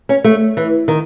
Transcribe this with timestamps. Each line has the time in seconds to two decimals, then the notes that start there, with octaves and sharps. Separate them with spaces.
0.09 C#4
0.24 A3
0.57 E3
0.88 D#3